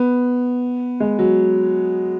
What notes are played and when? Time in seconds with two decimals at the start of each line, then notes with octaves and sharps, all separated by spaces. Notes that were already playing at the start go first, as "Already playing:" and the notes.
Already playing: B3
1.00 G#3
1.19 F#3